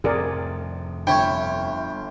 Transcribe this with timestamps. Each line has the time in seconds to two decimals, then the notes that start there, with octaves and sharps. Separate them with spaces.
0.04 F2 A2 C3 G#4 A#4 D5
1.07 G1 E4 C#5 G5